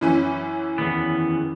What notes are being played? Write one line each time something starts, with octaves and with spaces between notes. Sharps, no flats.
F#2 E3 C#4 E4 E5
E2 D#3 B3